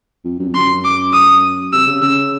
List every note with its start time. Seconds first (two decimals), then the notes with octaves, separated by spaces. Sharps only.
0.24 F2
0.39 F#2
0.47 F2
0.55 F#2 C6
0.84 D6
1.13 D#6
1.73 C3 E6
1.86 C#3
2.02 C#3 E6